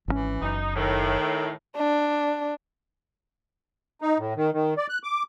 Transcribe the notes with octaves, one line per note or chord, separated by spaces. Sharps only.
G#1 D#3 E3 C#4
F#1 D#4
A2 D#3
D4
D#4
A2
D#3
D#3
D5
F#6
D6